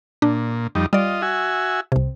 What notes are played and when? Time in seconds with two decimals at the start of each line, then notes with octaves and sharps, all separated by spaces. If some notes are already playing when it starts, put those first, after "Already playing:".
0.22 A#2 D4
0.75 F2 G3 D#4
0.93 G3 F4 D5 D#5
1.22 F#4 E5 G#5
1.92 C2 C3